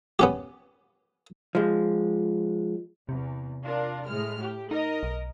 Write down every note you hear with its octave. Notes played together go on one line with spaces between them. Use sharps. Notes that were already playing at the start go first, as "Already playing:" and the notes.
B3 C#4 G4
F3 G#3
E2 C3
D4 F4 A#4
A2 G#3 F6
G4
D#4 A#4 D#5
B1